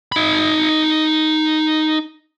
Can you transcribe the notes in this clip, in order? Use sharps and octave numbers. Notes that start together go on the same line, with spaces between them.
D#4 B5